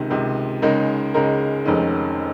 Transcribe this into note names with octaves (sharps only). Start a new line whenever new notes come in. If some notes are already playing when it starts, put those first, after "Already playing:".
Already playing: C#2 C3 D#3
C#2 C3 D#3
C#2 C#3 G#3 D#4 A#4
C#2 C#3 G#3 D#4 A#4
F1 F2 D#3 G#3 C#4